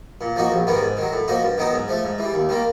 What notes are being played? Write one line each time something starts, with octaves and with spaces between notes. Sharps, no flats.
A#2
F3 A#3 D#4 F#4
A#1
G#2 D#3 G3 B3
G#2
D#3 F#3
A2
F3 A#3 D#4 F#4
G2
D#3 F#3 B3 D#4
G#2
F3 A3
G#2
E3 G3
D#2
D#3 G3 A#3